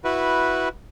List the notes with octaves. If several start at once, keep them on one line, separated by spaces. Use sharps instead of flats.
E4 F#4 B4